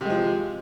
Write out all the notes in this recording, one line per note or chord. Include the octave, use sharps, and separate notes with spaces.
C3 F3 G#3